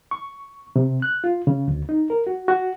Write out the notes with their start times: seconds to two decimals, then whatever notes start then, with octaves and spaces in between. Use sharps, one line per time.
0.11 C#6
0.76 C3
1.02 F#6
1.24 F4
1.47 C#3
1.68 D2
1.89 D#4
2.10 A#4
2.27 F#4
2.48 F#4